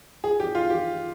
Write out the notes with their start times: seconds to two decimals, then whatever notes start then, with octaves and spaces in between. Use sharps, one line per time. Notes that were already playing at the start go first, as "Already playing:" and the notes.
0.24 G#4
0.40 G4
0.55 F4
0.70 G4